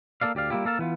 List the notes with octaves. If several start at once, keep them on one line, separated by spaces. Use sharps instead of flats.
A#3 B3 A4 D5 F5
D2 G4 D5 F5
G3 A#3 C#4 E4 F4 G4
A#3 A4 F5 A5
E3 B3 F4